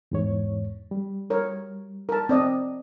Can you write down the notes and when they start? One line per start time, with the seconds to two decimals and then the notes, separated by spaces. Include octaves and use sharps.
0.11 E2 G#2 C#5
0.91 G3
1.30 A#4 C#5
2.09 A#4 A5
2.29 C4 D5 D#5